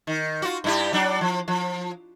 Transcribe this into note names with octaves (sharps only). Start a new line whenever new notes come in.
D#3
F4 F#4
G2 E4 G4
F#3 D4
F3
F3